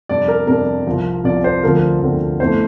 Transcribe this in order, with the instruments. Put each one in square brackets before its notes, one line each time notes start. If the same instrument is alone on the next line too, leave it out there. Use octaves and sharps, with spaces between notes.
[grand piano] F2 C3 G3 D4 D5
A#4
F2 C3 G3 D4 A#4
C2 C3 F3
C2 C3 F3 D5
C5
D2 D3 F3 C4 A#4
D2 D3 F3 C4
G1 F2 E3 A3 C5